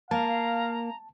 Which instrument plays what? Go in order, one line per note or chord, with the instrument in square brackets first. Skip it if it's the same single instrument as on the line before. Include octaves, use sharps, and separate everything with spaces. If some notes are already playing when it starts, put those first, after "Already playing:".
[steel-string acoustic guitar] A#3 [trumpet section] F5 [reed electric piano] A5 [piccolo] A#5